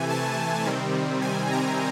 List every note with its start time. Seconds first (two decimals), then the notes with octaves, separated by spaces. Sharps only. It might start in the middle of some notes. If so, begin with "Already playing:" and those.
Already playing: C3 E3 A3 G#5
0.10 A5
0.65 C3 D#3 G3 C4
1.22 G#5
1.51 A#5